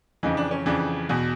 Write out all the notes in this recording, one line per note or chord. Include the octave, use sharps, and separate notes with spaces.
F2 C#3 E3 D#4
D4
C#4
F2 C#3 E3 D4
E2 B2